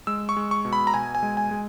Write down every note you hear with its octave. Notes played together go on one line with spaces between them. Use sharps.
G#3 E6
C#6
G#3
C#6
B2
B5
A#5
B2 G#5
G#5
G#3
G#5
G#3